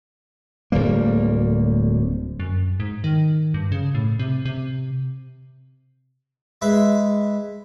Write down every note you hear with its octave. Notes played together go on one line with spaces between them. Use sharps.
D1 D2 G3 A#3
F#2
G#2
D#3
G2
C#3
A2
C3
C3
G#3 B4 E5